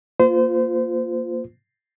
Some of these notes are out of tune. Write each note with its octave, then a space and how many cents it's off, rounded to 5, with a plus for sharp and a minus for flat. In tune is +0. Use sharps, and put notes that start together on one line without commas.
A#3 +0 F4 +0 C5 -30